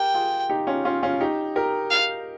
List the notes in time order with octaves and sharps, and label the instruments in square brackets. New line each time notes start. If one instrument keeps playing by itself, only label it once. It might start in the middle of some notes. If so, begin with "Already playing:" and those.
Already playing: [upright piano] G4 A#4 [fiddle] G5
[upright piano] F4 G#4
D#4 G4
C#4 F4
C#4 F4
C#4 F4
D#4 G4
G4 A#4
[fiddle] F5